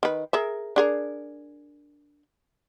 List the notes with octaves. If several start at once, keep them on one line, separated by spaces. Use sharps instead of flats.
D#3 B4
G#4 A#4 E5
D4 G#4 A#4